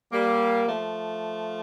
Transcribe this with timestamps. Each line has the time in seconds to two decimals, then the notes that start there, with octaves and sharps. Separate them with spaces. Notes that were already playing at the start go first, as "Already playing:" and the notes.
0.12 G3 A#3
0.66 F3 A3